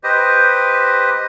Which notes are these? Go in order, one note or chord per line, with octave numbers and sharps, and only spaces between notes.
G4 B4 C5 D#5